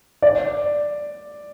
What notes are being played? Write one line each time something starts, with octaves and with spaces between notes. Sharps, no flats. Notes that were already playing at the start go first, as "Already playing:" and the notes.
D5